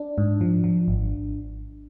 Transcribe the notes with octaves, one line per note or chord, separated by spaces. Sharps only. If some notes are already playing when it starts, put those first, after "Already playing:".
Already playing: D4
G#2
F3
F3
G#1